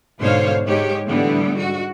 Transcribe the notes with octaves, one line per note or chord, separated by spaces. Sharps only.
G#2 B2 D3 C5 C#5 F5
G#2 G#3 G4 C#5
A2 D3 E3 G3 B3
G#2 F#4